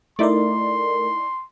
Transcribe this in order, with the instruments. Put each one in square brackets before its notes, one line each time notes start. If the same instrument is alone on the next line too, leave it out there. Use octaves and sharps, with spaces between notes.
[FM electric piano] A3 A#4 [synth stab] D#4 E4 D5 [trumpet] C6